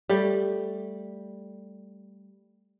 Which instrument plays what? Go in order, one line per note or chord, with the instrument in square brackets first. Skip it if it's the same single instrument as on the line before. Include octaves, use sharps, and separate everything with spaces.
[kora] G3 A3